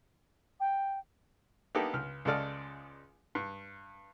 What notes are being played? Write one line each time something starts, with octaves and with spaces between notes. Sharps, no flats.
G5
A#3 B3 D4 D#4 G4 A4
C#2 F6
C#2 C#3 G#3 A4 D5 F6
G2